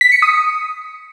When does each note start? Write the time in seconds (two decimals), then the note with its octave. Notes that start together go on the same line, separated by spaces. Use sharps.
0.01 B6
0.12 C#7
0.22 D#6